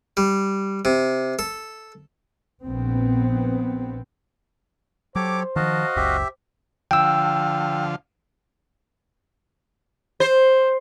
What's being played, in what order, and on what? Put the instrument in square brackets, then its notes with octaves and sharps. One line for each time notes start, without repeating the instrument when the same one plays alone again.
[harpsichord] G3
C3
A4
[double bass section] A#1 B3 C4
[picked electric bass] F#3 [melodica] G4 A4 C#5 [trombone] C5 [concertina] D6
[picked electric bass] D#3 F3 [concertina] F#4 D#5 F5 [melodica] A5
[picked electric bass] F#1 C#2 [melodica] G4 E5
[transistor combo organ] D3 F3 F5 [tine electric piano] G5 E6
[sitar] C5